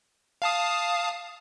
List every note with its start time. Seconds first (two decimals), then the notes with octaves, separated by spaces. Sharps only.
0.42 F5 A5 D#6